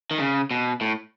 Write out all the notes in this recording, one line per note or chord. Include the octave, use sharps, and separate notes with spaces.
D#3
C#3
B2
A2